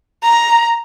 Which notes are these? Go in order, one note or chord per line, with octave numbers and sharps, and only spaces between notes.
A#5